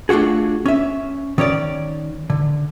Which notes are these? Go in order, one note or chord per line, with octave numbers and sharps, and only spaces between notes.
A3 D4 F4 F#4 G#4
C#4 E5
D#3 C#4 C#5 D5
D3